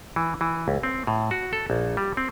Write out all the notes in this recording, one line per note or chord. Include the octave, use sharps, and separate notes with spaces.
E3
E3
C#2
C4
A2
F#4
A4
A#1
G3
C4